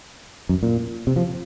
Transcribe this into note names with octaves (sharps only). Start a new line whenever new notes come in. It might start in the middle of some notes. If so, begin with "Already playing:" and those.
F#2
A#2
C3
F3